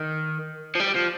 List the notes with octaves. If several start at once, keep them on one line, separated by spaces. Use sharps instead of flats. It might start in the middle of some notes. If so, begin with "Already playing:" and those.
Already playing: D#3
F3
G3
F3